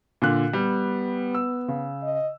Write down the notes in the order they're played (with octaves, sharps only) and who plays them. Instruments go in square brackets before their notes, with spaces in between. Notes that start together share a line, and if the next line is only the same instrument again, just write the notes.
[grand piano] A#2 D3 F#6
[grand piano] G3 [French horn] B3
[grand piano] E6
C#3
[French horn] D#5